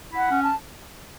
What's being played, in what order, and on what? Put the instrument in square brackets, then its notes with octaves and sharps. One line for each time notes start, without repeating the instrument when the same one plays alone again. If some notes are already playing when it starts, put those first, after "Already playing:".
[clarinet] E4
[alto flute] F#5
[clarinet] C#4
[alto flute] A5